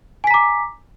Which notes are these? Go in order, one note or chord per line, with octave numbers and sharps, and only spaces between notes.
G#5 A#5 D6 B6